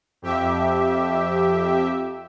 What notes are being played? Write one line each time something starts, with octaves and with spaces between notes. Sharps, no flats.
F2 G4 E5